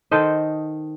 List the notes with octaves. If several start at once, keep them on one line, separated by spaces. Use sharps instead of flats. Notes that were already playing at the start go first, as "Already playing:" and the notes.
D#3 A4 C5 D#5